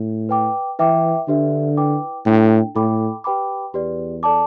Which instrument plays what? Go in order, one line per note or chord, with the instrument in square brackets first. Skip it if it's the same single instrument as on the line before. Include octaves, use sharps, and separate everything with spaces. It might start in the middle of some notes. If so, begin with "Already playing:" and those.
Already playing: [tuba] A2
[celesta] B4 G5 D6
[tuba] E3 [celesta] E4 B4 E5 G5 D6
[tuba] D3 [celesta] D4 G4 B4 E5
[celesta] E4 B4 G5 D6
[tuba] A2 [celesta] D4 A4 G5
[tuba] A2 [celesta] E4 A4 G5 B5 D6
[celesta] G4 B4 G5 B5 D6
[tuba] E2 [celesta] G4 B4 D5
[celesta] A4 D5 A5 D6